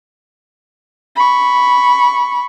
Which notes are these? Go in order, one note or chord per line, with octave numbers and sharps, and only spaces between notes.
B5 C#6